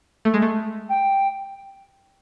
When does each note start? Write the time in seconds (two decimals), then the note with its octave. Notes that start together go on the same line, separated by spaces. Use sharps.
0.25 A3
0.34 G#3
0.42 A3
0.89 G5